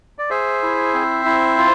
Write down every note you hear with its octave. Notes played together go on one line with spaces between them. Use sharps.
D5
G#4 C5 E5
E4
C4
E4
F4